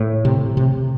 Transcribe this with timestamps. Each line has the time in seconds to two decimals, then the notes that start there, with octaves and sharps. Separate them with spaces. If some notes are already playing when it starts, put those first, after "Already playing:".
Already playing: A2
0.25 C3
0.57 C3